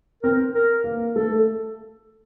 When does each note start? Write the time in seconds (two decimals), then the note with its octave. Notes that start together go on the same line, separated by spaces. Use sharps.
0.23 C4 A#4
0.55 A#4
0.84 A#3
1.15 A3 A4